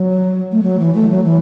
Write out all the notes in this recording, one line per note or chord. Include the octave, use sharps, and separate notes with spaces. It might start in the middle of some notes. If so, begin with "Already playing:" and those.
Already playing: F#3
A3
F#3
E3
A3
F#3
E3